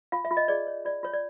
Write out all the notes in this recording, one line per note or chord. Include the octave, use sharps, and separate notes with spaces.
F4 F5
E5
F4
D#5
G#4 D5
C#5
F4 D5
F4 C#5
D5